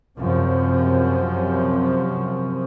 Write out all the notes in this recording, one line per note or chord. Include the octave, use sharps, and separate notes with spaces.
F#2 C3 F3